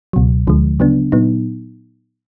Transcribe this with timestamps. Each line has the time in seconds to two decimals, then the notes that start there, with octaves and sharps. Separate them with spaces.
0.13 C#2 B2 F#3
0.47 D2 D3 F3 G#3
0.80 C#3 F#3 B3 D4
1.12 A#2 F#3 B3 D#4